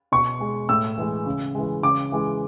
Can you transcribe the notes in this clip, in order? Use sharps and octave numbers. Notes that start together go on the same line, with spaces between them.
B2 C#6
G#3
A2 E6
E3 G#3
C#3
E3 G#3
C#3 D6
E3 G#3